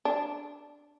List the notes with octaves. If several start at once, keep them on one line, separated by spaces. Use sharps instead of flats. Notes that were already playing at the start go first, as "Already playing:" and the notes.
D4